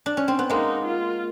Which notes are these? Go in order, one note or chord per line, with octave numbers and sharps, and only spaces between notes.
D4
C#4
C4
B3
G#3 A#3 D#4
F4